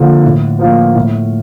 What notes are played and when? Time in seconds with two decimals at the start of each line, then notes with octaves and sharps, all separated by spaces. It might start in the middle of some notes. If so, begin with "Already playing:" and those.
Already playing: D3 F3 A#3 F4
0.24 A2
0.59 F3 A#3
0.95 A2